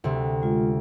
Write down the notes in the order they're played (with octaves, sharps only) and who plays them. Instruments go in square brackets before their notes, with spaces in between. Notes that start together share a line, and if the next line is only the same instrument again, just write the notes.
[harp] D2 C3
[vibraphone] G#3 F4